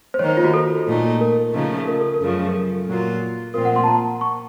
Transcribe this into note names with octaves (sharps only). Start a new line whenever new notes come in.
C5
D#3 A#3 D#4 C#5
C5
F4
F#4
A4
A#2 A3 D#4
A#4
C#3 F3 A3 D#4
A#4
A4
A#4
F#2 C#3 F3 A3
A#4
A4
A#2 F#3 A#3 F4
A#2 F3 C4 F4 A#4
F#5
C6
A5
A#5
C#6